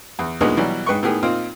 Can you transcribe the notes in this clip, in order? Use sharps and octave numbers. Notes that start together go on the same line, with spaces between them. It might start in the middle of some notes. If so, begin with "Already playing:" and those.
E2
D2 A#2 G#3 B3 D#4
B2 E3 F#3 G3
G#2 B4 G5 C#6
A2 D#3 B3 G4 G#4
A#2 C4 D#4 F4